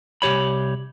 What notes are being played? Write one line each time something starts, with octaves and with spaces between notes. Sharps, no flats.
C2 C3 G4 C#5 B5